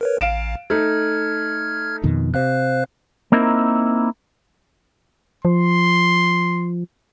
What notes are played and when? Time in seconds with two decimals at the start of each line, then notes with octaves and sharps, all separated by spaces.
0.01 A#4 B4 C#5
0.21 A1 F5 D7 E7
0.70 A3 D#4 F6 G#6
2.04 F2 B2 D#3
2.34 C3 C5 F5 F#6
3.32 A#3 C4 D#4 E4 A#4
5.45 F3 C6